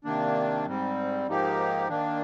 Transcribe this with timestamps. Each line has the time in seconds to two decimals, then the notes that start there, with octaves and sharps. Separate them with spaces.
0.04 C3 D#3 A#3 D4
0.66 G#2 G3 C4
1.27 G#2 F3 A#3 D#4 G4
1.89 D#3 A#3 D4